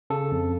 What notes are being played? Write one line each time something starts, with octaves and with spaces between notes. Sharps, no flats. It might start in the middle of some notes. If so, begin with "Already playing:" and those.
C#3 A4
F2